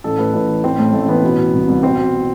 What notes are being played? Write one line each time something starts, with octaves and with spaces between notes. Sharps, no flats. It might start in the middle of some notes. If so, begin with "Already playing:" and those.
A1 A4
A2 B4
A1 B4
E3
A1 C4
A2 A3
A1 A3
E3 B3
B2
B2
C2
C2
B2 C4
B2